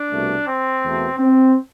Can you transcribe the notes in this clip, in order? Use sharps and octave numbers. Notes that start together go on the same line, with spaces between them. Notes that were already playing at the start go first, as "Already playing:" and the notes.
Already playing: D4
C2 B2 A3
C4
E2 B2 A3
C4